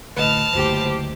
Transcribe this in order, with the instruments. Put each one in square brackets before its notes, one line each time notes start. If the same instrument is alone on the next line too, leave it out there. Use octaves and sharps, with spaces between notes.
[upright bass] A1 D2 [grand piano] B4 D#5 [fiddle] A5 F6
[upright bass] F#1 D2 [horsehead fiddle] G4 C5